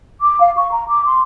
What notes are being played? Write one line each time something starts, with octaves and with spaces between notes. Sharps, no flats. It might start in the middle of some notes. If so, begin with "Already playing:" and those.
D6
F5
C#6
A#5
D6
C6